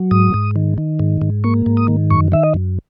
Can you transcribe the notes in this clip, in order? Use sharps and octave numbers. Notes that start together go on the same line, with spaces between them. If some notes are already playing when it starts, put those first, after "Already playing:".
Already playing: F#3
G#2 D#6
G#2
D#3
D#3
G#2
G#2
A#3 C#6
G#2
D#6
D#3
F#2 C#6
D#3 E5
D#5
F#2